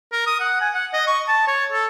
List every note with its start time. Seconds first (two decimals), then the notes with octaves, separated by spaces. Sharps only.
0.12 A#4
0.27 D#6
0.40 F#5
0.61 G#5
0.74 F#5
0.93 D#5
1.07 C#6
1.28 A5
1.48 C#5
1.72 A4